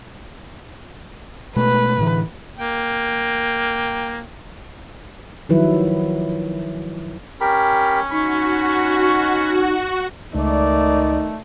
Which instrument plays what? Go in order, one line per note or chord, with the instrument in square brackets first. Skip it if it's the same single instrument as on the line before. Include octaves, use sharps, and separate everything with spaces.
[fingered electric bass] B2 G#3 A3 [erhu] B4
[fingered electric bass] A2 D3 E3
[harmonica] A#3 G5
[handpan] D#3 F3 F#3 E4 B4
[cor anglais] C#4 [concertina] G4 A#4 B5 [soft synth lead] A#5
[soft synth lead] D#4 [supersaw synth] F#4 [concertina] B5 C#6
[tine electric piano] C#2 [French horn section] D#3 A#4 D5 [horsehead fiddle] A3 [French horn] D#4